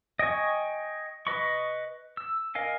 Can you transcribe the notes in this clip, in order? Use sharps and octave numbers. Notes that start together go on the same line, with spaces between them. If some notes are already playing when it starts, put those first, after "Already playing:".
D#5 G5 G#5 C#6
B4 D#5 B5 C#6
E6
A#4 D#5 F5 G#5